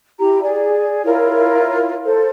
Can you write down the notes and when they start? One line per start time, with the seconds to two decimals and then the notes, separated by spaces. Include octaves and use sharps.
0.19 E4 G4 A#5
0.42 G#4 D5
1.04 E4 F4 A#4 C#5
2.04 A4 C5